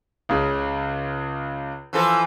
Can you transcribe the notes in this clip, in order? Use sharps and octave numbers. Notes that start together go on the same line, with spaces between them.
C#2 C#3
E3 F3 A4